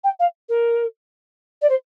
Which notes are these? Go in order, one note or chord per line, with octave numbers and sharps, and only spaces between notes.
G5
F5
A#4
D5
C5